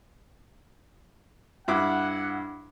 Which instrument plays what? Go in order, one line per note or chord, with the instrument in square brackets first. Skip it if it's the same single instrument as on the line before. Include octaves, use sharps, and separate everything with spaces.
[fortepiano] G2 E4 D6 [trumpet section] F#5